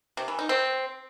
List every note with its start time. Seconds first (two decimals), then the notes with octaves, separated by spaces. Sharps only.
0.17 C3
0.28 E3
0.39 D#4
0.49 C4